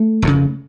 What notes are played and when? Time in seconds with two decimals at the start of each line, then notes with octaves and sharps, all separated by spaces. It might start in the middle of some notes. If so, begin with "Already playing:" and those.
Already playing: A3
0.22 F1 F2 C#3